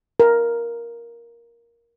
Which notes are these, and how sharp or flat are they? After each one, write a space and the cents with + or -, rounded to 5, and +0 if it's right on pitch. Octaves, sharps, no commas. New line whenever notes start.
A#4 +5